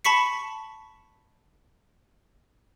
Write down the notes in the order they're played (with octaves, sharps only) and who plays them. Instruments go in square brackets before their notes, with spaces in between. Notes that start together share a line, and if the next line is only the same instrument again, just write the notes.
[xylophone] A5 B5 C#6 B6 C#7